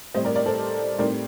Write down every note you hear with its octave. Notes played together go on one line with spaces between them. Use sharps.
A2 G3 C4 C5 D#5
A#4 D5
A#4 D5
A4 C5
A2 G3 C4 D#4 A#4 D5